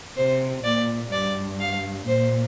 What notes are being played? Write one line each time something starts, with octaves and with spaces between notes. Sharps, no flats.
C3 C5
A#2 D5
G2 D5
F5
A#2 C5